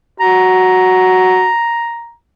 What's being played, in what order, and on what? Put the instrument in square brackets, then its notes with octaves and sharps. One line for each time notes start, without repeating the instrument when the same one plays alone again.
[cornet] F#4 [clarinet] A#5